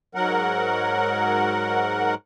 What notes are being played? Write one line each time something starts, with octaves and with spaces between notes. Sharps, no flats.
G#2 F#3 A#4 F#5